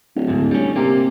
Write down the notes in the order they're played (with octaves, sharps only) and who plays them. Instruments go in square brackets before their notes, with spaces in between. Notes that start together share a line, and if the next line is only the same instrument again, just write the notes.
[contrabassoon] D1
[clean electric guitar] D2 G#2
G3 C#4
[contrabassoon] C3 [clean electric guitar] A#3